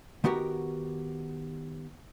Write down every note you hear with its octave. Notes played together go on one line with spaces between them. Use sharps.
D#3 B3 F#4 G4 A#4